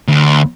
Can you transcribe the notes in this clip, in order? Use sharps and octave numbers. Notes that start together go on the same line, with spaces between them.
D2